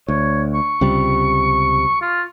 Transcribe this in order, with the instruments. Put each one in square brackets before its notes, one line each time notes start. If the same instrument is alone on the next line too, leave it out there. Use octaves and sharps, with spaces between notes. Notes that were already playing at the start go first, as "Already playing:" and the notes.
[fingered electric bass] D2 [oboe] C#5
[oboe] C#6
[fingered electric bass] C#2 C3 G3
[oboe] F4